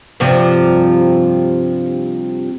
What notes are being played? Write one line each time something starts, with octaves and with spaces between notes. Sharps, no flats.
G2 C3 F3